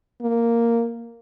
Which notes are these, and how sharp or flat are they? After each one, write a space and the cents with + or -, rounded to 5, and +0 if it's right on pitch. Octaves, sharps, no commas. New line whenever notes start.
A#3 -5